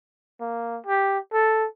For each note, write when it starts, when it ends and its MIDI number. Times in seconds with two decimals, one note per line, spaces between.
0.41 0.79 58
0.87 1.18 67
1.33 1.67 69